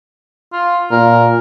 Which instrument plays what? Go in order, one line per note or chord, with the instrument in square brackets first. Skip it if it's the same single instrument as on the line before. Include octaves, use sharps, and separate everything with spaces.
[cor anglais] F4
[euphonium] A#2 [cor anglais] A#4